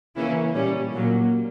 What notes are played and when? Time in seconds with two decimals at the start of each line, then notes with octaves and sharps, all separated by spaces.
0.16 C#3 E3 A#3 C#4 E4
0.54 A#2 G3 C#4
0.92 A#2 F#3 A#3